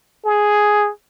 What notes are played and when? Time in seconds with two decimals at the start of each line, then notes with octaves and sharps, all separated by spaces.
0.25 G#4